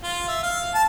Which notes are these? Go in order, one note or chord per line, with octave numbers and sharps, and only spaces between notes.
F4
E5
F5
A5